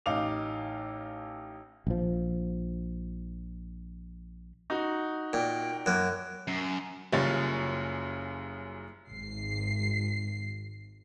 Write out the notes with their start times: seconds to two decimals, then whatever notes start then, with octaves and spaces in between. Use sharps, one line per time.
0.06 A1 D#4 F5 D6 F7
1.87 A#1 F3
4.70 D#4 F#4
5.33 A#2 G5
5.86 F#2 A#3 F#6
6.48 F#2
7.12 F#1 F#2 G3 F4 C#5 A6
9.12 G#1 C7